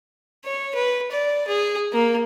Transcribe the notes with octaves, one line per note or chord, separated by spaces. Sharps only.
C#5
B4
D5
G#4
A#3